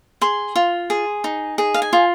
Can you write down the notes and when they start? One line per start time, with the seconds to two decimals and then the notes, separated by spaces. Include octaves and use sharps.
0.21 G#4 C6
0.56 F4
0.90 G#4
1.24 D#4
1.58 G#4
1.74 F5
1.82 G#5
1.93 F4